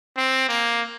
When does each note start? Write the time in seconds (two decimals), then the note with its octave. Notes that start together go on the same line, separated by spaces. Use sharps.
0.18 C4
0.49 A#3